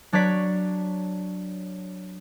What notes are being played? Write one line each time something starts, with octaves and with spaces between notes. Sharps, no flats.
F#3 D4 C#5 D5 B6